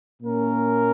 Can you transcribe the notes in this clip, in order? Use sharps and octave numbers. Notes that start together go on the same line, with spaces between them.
A#2 A#3 C#4 A#4